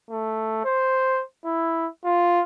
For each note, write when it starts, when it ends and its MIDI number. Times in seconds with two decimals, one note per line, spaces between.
0.10 0.62 57
0.65 1.22 72
1.45 1.87 64
2.05 2.42 65